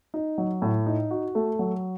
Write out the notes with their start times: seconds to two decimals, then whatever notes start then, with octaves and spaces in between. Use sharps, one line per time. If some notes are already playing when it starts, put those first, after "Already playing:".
0.14 D#4
0.38 F#3
0.62 A2
0.86 D#4
1.11 F#4
1.35 A3
1.59 F#3